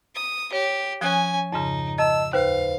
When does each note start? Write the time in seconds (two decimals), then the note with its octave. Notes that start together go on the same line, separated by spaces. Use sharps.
0.15 D#6
0.53 G4 C#5
1.01 F3 C#4 G#5 D#6 F#6
1.53 F2 G#2 C#3 D#4
1.98 D#5 A5 E6
2.33 D#2 B4 C5 F5